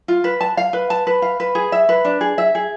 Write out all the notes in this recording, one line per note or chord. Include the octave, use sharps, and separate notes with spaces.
F4
B4
A5
F5
B4
A5
B4
F5
B4
G#4
E5
B4
D4
G#4
E5
G#4